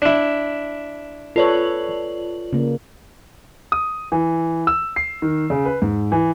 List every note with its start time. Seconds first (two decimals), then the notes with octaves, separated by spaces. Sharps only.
0.02 D4 E4
1.36 F4 A4 B4 C#5 D5 F#7
2.53 C#3 A#3
3.72 D#6
4.12 E3
4.67 E6
4.96 C7
5.22 D#3
5.50 C#3
5.65 B4
5.82 G#2
6.12 E3